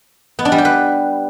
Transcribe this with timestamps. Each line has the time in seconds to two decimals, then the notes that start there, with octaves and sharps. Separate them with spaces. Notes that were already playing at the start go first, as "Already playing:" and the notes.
0.39 B3
0.45 D4
0.52 G3
0.58 G4
0.65 B4